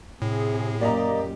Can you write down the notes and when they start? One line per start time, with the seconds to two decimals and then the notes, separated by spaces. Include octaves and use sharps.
0.22 A2 C3 G#4
0.81 F#2 A#2 A#3 G4 D5 D#5 A#5